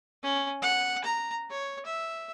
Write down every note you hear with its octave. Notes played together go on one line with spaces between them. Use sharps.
C#4
F#5
A#5
C#5
E5